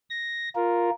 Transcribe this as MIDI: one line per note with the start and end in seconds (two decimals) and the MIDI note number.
0.10 0.49 94
0.55 0.90 65
0.55 0.90 70